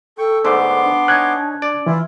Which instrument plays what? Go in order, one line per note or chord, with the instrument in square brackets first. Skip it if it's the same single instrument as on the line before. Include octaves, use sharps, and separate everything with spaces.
[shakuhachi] A4 [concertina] G5 C#6
[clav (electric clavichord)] G#2 D3 A3 [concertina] B3 C6 D6
[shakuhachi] D4
[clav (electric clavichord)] C#4 D#4 [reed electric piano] F#6 G#6
[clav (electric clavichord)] D5
[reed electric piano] E3 [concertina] E4 F4